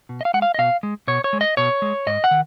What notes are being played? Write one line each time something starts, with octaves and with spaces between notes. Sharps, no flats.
B2
D#5
F5
G#3 F#5
F5
D#5
B2 F5
G#3
B2 C#5
C#5
G#3
D#5
B2 C#5
G#3
G#2 D#5
F#5
D#3